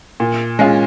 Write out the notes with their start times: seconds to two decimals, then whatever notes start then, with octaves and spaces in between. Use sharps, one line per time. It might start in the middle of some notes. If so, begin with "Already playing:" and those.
0.20 A#2
0.59 G#3 C#4 F4